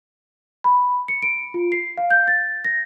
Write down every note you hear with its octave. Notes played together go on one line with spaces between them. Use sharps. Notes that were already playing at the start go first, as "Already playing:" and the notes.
B5
C#7
D7
F4
C7
F5
G6
A6
A#6